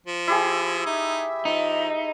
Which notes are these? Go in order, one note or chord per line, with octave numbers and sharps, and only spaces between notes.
F3
E4 G4 G#4
D#4 E5
F3 D#4